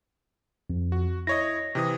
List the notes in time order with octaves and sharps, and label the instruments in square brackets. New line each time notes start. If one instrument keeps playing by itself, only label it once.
[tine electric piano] F2
[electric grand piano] F#4
[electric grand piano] E4 C#5 D#5 [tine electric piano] A#6
[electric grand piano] C3 E3 D#6